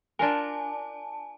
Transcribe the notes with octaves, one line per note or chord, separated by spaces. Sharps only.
D4 F4 A#4 G#5 A5